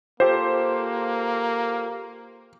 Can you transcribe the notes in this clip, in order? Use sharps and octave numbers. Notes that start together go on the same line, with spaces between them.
A#3 F4 G4 A4 C5